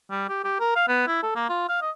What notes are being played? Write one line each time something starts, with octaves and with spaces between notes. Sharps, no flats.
G3
G4
G4
A#4
F5
B3
E4
A4
A#3
F4
F5
D#5